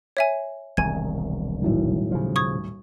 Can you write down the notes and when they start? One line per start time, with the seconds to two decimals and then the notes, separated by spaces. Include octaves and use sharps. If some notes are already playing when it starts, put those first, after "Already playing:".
0.17 C#5 E5 G#5
0.77 E1 C2 D#3 G#5 G#6
1.62 D#1 B1 A2
2.11 C#3 F3
2.36 C#6 D#6 G#6